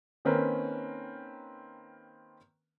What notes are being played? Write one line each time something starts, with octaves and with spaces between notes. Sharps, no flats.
D#3 A#3 C4 C#4 A#4 B4